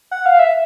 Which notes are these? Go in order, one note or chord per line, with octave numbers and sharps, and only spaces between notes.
F#5
F5
E5